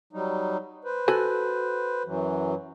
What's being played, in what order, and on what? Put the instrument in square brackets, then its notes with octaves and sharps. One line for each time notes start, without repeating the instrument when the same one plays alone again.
[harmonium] F#3 G3 D#4
B4 C5
[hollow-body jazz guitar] F#4 A4 G#5
[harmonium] F#2 E3 F#3